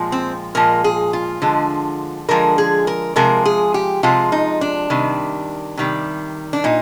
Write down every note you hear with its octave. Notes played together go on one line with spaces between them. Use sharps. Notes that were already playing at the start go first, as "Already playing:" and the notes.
Already playing: A#2 F3 G#3
C4
A#2 F3 G#3 A#4
G#4
F4
D3 F3 G#3
D3 F3 G#3 A#4
G#4
A#4
C3 F3 G#3 A#4
G#4
G4
C3 F3 G#3 F4
D#4
D4
C3 D#3 G3
C3 D#3 G3
D4
A#2 D#4